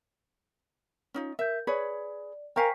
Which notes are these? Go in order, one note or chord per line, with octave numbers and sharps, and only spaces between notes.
C#4 D#4 F4
A#4 E5 G6
G#4 B4 C#5 D5
A#4 C5 F5 G5 G#5 C#6 B6